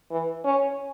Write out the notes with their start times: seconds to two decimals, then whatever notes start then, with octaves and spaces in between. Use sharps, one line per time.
0.11 E3
0.45 C#4